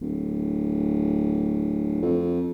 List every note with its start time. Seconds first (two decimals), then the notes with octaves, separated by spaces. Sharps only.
0.01 D1
2.02 F2